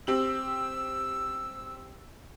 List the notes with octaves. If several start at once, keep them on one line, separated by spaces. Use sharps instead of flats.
C4 G4 E6 F#7